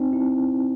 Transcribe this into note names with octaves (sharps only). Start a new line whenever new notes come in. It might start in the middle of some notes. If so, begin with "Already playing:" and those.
Already playing: C4 D#4
E4